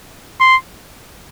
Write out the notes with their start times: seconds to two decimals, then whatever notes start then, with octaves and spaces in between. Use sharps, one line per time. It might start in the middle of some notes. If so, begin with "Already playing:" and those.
0.40 C6